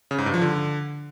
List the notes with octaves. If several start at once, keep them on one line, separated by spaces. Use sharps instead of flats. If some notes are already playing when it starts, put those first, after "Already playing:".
C#3
G#2
G2
F3
D3